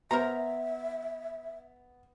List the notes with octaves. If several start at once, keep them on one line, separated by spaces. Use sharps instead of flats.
B3 A#4 C5 E5 A#5